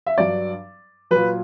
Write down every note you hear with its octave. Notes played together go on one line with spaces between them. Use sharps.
E5
G2 F#3 D5
A#2 F#3 B4